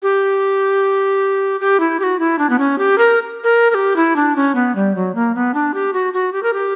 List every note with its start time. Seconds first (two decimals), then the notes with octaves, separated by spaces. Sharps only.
0.03 G4
1.60 G4
1.80 E4
2.00 G4
2.03 F#4
2.19 E4
2.39 D4
2.50 B3
2.59 C#4
2.78 G4
2.98 A#4
3.44 A#4
3.71 A#4
3.75 G4
3.96 E4
4.16 D4
4.36 C#4
4.55 B3
4.75 G3
4.95 F#3
5.15 A#3
5.35 B3
5.54 D4
5.74 G4
5.93 F#4
6.13 F#4
6.32 G4
6.43 A#4
6.53 G4